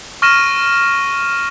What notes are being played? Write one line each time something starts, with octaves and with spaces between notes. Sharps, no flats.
C#6 F6 A#6 D#7 E7